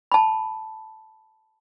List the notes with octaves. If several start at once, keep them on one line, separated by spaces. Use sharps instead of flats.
A5 B5